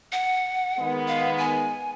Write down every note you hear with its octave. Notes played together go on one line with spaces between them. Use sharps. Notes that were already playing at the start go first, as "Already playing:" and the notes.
F#5
D#3 G#3 B3
F5
G#5